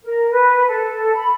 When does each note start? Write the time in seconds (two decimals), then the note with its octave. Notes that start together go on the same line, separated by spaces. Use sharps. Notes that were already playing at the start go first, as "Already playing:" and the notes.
0.03 A#4
0.30 B4
0.68 A4
1.14 B5